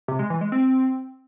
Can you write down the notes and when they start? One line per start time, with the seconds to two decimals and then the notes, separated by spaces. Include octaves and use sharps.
0.08 C3
0.19 G#3
0.30 E3
0.41 G#3
0.52 C4